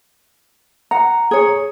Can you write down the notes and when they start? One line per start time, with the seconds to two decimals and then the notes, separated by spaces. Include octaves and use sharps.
0.91 F#5 A#5
1.31 G#4 C#5